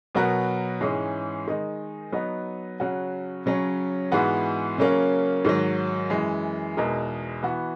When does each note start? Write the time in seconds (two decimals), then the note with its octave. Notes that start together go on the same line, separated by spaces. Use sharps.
0.15 B2 F#3 B3 F#4 A#4
0.81 G#2 E3 G#3 C#4 G#4
1.47 D#3 G#3 D#4
2.12 F#3 B3 D#4
2.80 C#3 F#3 C#4 F#4
3.46 C#3 F#3 C#4
4.12 G#2 E3 G#3 B3 F#4
4.78 C#3 F#3 A#3 C#4
5.45 G#2 D#3 F#3
6.10 F#2 E3 G#3
6.77 E2 B2 G#3 D#4 A#4
7.43 E3 B3 F#4